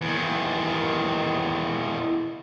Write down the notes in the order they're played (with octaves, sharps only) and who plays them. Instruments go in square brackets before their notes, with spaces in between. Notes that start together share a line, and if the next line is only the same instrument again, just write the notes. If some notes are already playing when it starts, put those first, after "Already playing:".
[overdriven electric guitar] E2 D#3